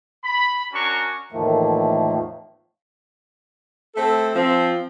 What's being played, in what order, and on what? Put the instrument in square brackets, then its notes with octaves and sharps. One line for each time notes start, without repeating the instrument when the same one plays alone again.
[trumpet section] B5
C#4 D4 F#4 A#4 C#6
[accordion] E2 A2 D#3 F3 A3 A#3
[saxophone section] A3 C4 A4
F3 C4